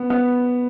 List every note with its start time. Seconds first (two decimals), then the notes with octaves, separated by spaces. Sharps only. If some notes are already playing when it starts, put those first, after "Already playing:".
Already playing: B3
0.10 B3